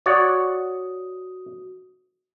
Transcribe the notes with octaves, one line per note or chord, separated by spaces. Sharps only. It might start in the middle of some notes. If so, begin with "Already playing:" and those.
F#4 C#5 D5 F#5 D#6